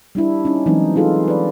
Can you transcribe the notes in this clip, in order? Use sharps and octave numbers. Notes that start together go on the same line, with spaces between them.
G3 D4 E4
C#4 D#4
E3 F#3 G#3 C4 D#4
D#4 F4 G#4 A4
B4 D5